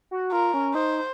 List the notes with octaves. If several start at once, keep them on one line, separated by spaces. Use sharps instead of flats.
F#4
F4 A#4
C#4
D#4 C5